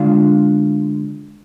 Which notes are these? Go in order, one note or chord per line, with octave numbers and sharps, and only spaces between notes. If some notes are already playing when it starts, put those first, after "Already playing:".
Already playing: D3 G#3 D4 F4 F5